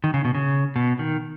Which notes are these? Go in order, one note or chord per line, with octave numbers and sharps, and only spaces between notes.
D#3
C#3
B2
C#3
B2
D#3